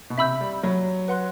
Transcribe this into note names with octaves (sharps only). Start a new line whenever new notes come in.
B2
C3 E5 B5 E6 G6
G3
F#3
B4 F#5 C6 F#6